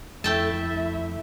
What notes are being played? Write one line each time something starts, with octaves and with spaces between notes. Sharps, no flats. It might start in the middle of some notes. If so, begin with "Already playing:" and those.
F2 A3 E4 E5 G5 A5